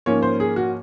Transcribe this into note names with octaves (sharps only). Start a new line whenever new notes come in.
G#2 F3 A#3 C#4 C#5
C5
G#4
F#4